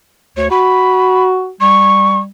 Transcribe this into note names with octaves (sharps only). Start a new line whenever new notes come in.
D2 C#5
F#4 B5
G3 C#6